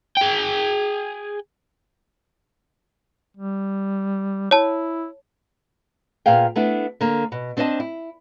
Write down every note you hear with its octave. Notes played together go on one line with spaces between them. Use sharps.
G#4 G5
G3
E4 C#5 A5
A#2 B3 G#4 F5 G5
A3 B3 D4 E4
D3 A#3
B2
C4 D4 C5 C#5 D#5 A5
E4